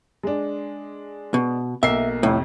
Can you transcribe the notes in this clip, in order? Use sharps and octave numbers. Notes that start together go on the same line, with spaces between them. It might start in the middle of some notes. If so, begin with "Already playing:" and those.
G#3 D4
B2
B1 A#3 E5 C7
F2 A2 C3